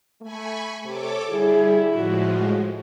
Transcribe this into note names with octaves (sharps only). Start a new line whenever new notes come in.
A3 G#5 B5 C#6
C3 A4 C#5 D6
D3 G3 E4 G#4
A2 F3 G#3 F#4